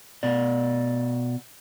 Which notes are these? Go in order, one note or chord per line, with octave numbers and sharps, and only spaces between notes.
B2 D5